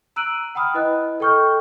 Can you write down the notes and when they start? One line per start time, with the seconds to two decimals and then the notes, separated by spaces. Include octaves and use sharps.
0.16 A#5 E6 F#6 D7 D#7 F#7
0.55 F#5 G5 B5 D#6 F6
0.74 E4 B4 D#5 F#6
1.20 A4 D#5 G5 C#6 F6 G6